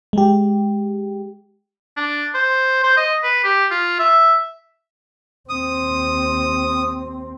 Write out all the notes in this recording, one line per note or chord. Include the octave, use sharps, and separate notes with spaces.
G#3 G4
D4
C5
C5
D#5
B4
G4
F4
E5
D#2 C4 D#6